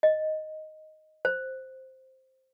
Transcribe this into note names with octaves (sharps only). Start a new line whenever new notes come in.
D#5
C5